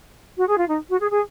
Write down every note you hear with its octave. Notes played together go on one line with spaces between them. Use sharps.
F#4
G#4
F4
D#4
F#4
G#4
G#4